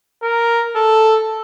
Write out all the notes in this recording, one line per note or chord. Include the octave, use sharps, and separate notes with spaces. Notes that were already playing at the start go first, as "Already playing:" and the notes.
A#4
A4